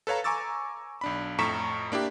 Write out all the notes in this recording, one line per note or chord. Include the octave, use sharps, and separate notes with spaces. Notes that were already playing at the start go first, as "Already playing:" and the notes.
A4 B4 C#5 F5 A#5
G#5 A#5 C#6 D6 E6 A6
B1 D4 B5
F2 A2 A#5 C#6 B6 E7
A#3 D4 E4 G4